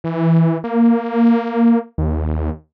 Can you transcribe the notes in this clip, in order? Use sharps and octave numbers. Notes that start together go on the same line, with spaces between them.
E3
A#3
D#2